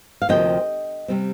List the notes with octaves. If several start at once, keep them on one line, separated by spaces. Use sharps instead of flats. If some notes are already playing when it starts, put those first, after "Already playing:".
F5
D2 C3 F3 A#3 D#5 G5
C3 G3 C4